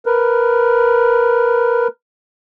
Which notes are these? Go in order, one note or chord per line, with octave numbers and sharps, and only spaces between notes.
A#4 B4